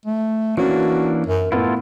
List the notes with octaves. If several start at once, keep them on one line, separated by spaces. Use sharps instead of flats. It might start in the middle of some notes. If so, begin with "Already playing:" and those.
A3
E3 A#3 C#4 D4 F#4
F#2
F#2 A2 B3 E4 F4 A4